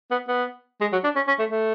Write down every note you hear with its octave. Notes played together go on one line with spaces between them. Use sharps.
B3
B3
G#3
F#3
D4
C#4
C#4
A3
A3